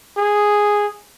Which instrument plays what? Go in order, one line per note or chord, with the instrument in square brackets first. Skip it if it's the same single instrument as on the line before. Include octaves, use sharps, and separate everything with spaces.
[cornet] G#4